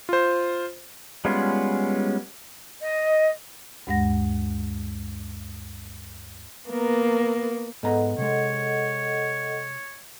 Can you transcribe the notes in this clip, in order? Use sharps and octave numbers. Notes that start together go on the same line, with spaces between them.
F4 C5
G3 G#3 B3 C#4 F4
D#5
D2 G2 G#3 F#5 A#6
A#3 B3 A#4
G#2 B3 A4 D#5 F#5 A#5
C3 G#3 C#5